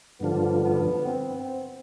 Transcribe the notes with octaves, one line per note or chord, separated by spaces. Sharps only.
G2 D3 F3 B3
B3
C4
C4